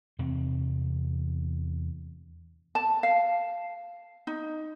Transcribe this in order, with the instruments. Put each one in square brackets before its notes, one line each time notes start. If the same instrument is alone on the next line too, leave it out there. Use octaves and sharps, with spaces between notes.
[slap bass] E2 C3 C4
[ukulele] A5
F5
D#4